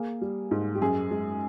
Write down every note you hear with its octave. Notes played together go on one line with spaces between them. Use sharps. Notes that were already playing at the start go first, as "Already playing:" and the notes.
Already playing: A#3 G#4
G3
G#2
G4
F#2 G#4
G#3